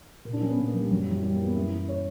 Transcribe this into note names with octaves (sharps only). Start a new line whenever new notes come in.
A#2 A#4
D4
F#3 C#4
B3
A#2 A#3
B3
F#3
G3
F#2 F#3
G3
E3 F#3
F#2 G3
A#3
E3
B3
F#2 E4
E3
C#5